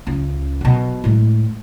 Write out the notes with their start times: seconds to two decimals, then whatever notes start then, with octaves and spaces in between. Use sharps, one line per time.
0.07 C#2 C#3
0.61 B1 B2
1.04 A2 G#3